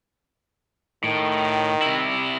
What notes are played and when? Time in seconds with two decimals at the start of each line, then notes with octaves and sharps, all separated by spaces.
1.04 A2 D#3
1.82 C3 E4